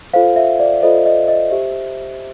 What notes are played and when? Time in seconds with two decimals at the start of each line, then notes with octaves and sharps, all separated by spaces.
0.14 F4 A4 C5 F5
0.36 E5
0.60 D5
0.82 F4 A4 C5 D#5
1.06 D#5
1.28 D#5
1.51 G4 C5 E5